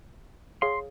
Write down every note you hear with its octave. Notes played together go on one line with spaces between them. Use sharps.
G#4 C#5 F5 C6